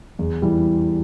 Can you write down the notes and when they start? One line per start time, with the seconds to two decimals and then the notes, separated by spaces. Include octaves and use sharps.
0.19 E2
0.42 E3 G3